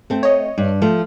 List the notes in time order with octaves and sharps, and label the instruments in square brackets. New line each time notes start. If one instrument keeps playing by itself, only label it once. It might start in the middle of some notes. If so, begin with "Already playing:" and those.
[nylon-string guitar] A3 C4
[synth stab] C#5 D#5
[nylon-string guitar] G2
F3 A3